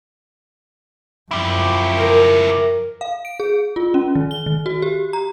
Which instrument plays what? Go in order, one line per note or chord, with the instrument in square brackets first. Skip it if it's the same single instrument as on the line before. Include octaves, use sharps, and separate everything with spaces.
[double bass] F#2 F3 [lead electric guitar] E4 G4
[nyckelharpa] A#4
[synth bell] F5
D7
G#4
F4
C#4
D#3
G7
D#3
F#4
G4
A#5